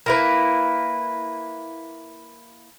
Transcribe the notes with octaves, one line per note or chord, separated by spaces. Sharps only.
A#3 E4 B4